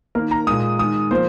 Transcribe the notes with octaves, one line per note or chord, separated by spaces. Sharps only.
D#3 A#3 A#4
A#5
A#2 G#3 D#6
D#3 G#3 D#6
F3 A#3 C5